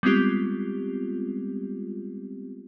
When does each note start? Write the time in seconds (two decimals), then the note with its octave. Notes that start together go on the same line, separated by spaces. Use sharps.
0.03 G3 G#3 B3 C4 F4 G4